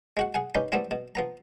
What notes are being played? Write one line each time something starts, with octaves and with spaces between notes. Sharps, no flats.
G#3 F#4 F#5
G#4 F#5 G#5
C#4 D#4 G4 B4
G3 A3 B3 C4 E4
B2
F3 B3 A#5